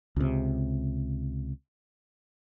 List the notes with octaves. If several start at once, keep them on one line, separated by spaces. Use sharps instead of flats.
C#2 C3